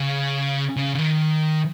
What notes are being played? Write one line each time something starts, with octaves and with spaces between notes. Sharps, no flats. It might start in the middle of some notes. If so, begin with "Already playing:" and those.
Already playing: C#3
C#3
C#3
D#3